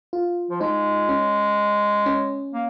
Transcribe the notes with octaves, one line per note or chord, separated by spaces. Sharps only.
F4
F3
G#3 D#4
C#4
C#4
A#3